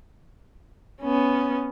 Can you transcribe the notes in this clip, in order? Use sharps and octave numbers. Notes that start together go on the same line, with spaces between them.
B3 C#4